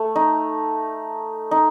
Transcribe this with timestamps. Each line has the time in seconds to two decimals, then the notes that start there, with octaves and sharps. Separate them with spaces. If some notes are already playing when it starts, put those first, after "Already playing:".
Already playing: A3
0.16 D#4
1.51 D#4